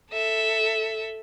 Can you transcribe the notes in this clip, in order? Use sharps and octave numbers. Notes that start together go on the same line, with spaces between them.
A4 E5